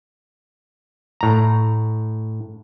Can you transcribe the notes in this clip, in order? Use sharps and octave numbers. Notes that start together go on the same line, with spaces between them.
A2 A#5